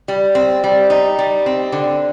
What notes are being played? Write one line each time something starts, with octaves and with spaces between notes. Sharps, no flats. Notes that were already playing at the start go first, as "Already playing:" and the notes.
G3
C4
G3
D#4
G3
C4
D3